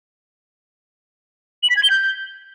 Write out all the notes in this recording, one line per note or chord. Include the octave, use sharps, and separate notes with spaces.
F#7
B6
G#6
G7
G6